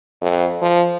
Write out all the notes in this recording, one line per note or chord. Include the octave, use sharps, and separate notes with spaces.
F2
F3